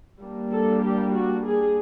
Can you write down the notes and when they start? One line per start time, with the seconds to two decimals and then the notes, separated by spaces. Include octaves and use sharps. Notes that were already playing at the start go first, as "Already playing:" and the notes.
0.20 G3 A#3 D4
0.51 A4
0.83 G4
1.14 F#4
1.45 G#4